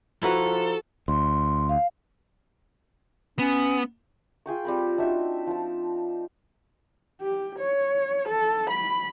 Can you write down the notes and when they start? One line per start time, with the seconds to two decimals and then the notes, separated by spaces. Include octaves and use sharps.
0.23 F3 E4 F#4 A4 B4 A#5
1.08 D2 C6
1.69 F5
3.39 B3 C#4
4.46 F4 G#4 G5 C#6
4.65 G3 C4 B5
4.98 D4 D#4 F#4 E5
5.47 F3 A5
7.21 G4
7.59 C#5
8.29 A4
8.70 B5